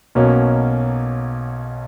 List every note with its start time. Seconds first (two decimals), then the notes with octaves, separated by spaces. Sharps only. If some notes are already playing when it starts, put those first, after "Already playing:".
0.15 B1 B2 A#3 C#4